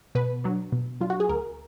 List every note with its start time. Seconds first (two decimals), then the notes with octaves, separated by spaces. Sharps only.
0.15 B2 B4
0.44 F#3 D4
0.72 B2
1.01 F#3 D4 F4
1.10 F#4
1.20 G#4
1.29 D2 A#4